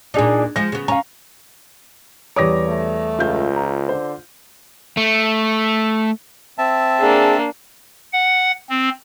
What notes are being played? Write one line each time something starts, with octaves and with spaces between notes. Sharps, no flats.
A#2 D4 D#4 G#4
F3 G#3 A#6
C#3 B3
C#4 F5 A#5
E2 G3 C#5 D6 D#6 A#6
A3
C#2 F4 F5 G6
A#5
D3 C5
A3
C4 E5 A5
A#3 D4 G#4
F#5
C4